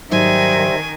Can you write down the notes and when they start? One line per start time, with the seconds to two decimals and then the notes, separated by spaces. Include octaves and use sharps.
0.12 G#2 D#3 F#3 G3 D#4 C5 E5 G#5